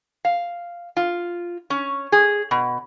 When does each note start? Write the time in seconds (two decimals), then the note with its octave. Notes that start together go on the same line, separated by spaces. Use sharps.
0.25 F5
0.97 F4
1.70 C#4
2.12 G#4
2.51 B2